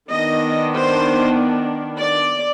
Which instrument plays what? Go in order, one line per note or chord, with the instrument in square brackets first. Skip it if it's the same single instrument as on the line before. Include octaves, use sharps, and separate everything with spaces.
[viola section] D#3 B3 D4 D#5
C5
D5